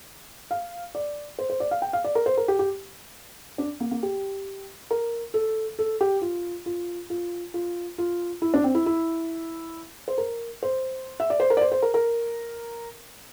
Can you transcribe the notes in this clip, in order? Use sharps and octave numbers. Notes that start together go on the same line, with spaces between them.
F5
D5
C5
C5
D5
F5
G5
F5
D5
A#4
C5
A#4
G4
G4
D4
A#3
A#3
G4
A#4
A4
A4
G4
F4
F4
F4
F4
F4
E4
D4
C4
E4
E4
C5
A#4
C5
E5
D5
C5
A#4
D5
C5
C5
A#4
A#4